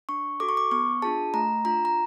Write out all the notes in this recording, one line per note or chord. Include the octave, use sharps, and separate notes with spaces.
D4 C#6
F#4 A4 D6
C#6
D6
B3 C#6
D4 F4 G#4 A5
A3 A#5
D4 F4 A#5
A#5